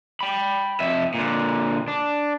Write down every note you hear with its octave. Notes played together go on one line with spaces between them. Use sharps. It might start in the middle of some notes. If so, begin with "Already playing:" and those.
G5 B5
F2 E5
A#2 D3
D4